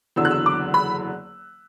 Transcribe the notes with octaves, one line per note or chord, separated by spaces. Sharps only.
F#1 E2 D3 F#3 E6
F#6
E6
D6
B5